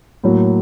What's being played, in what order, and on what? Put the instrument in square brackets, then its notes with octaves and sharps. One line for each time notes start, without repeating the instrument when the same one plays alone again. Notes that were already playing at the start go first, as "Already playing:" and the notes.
[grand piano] A2 F#3 A#3